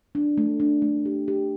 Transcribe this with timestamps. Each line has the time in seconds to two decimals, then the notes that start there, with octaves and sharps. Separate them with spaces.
0.15 D4
0.37 A3
0.60 D4
0.82 A3
1.06 G4
1.28 G4